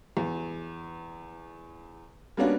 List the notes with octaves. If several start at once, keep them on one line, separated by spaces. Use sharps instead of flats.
E2
G3 A#3 B3 C#4 D4 F#4